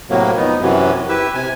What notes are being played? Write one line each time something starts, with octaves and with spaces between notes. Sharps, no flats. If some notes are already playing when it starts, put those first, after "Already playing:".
A2 C3 F#3 A#3
F2 B3 D#4
F#2 C3 E3 F#3
E4 G4 B4 E5
C3 G#5